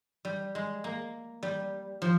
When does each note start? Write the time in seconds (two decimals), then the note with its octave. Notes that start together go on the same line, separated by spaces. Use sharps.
0.25 G3
0.55 G#3
0.84 A#3
1.43 G3
2.02 F3